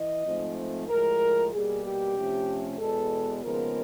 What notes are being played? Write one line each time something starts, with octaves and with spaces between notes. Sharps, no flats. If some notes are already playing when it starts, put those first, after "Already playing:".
Already playing: E3 D#5
G#2 F3 A3 C4
A2 F3 G#3 A#4
B2 G3 A#3 G#4
G4
C3 F3 A3 C#4
E2 B2 G#3 B3 A4
D#2 C#3 F3 G#3 B3 A#4